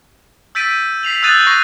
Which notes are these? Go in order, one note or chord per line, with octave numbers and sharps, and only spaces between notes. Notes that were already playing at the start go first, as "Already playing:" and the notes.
E6 G6 A6 B6 D7 D#7
B6 C7 F7 F#7
D#6 E6 F#6 G6 A6 D#7
C#6 F#6 G6 A#6 C7 D#7